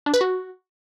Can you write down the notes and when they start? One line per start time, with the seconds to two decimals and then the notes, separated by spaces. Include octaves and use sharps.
0.06 D4
0.14 B4
0.21 F#4